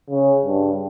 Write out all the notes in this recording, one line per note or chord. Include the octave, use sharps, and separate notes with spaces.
C#3
G2